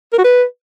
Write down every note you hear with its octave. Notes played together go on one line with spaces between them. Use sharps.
A#4
F#4
B4